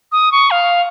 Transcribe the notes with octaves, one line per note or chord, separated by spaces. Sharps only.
D#6
C#6
F5